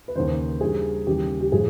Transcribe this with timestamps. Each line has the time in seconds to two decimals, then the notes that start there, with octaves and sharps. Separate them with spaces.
0.08 B4
0.15 D#2 C#3 E3 C5
0.61 G2 E3 G3 G#4
1.07 D#2 C#3 E3 G3 G4
1.41 G4
1.52 A2 F3 G#3 G#4